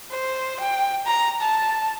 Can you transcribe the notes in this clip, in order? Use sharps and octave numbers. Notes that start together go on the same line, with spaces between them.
C5
G5
A#5
A5